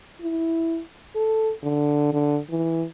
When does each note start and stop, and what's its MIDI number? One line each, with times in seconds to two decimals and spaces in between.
0.21 0.80 64
1.15 1.52 69
1.63 2.12 50
2.13 2.38 50
2.50 2.85 52